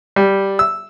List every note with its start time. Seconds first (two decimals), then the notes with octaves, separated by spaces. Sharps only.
0.16 G3
0.59 E6